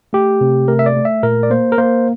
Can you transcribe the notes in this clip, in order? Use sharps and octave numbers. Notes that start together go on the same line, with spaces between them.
A3 G4
C3
A3 A#4
E5
D5
A3
E5
A#2 A#4
D5
A#3 C5
A#4
A#3 C5